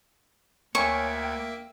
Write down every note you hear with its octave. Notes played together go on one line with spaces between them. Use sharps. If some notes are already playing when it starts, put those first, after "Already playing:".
D2 A#3 C#5 E5 G5 G#5 C#6 G#6
G5